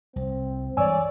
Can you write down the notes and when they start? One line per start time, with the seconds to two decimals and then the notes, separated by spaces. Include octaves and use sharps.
0.16 C2 C4
0.77 G2 E3 G#3 C#5 D5 G#5 E6